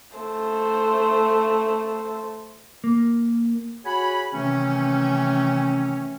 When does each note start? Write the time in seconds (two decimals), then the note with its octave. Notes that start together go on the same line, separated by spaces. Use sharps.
0.17 A3 C5
2.84 A#3
3.85 F#4 G#4 C#5 F#5 G#5 B5
4.34 C3 D#3 E3 A3 C4 C#4